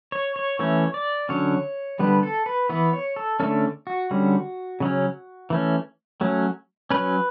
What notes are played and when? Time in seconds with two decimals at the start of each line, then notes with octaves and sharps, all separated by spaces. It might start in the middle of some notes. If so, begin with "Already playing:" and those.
0.12 C#5
0.36 C#5
0.59 E3 A3 C#4 C#5
0.94 D5
1.29 D3 F#3 C#4 C#5
1.99 D3 G3 B3 B4
2.23 A4
2.46 B4
2.69 E3 B3 B4
2.93 C#5
3.16 A4
3.40 D3 A3 C#4 A4
3.87 F#4
4.11 D3 G3 C#4
4.80 C#3 F#3 C#4
5.50 E3 A3 C#4
6.21 F#3 A3 C#4
6.91 F#3 C#4 B4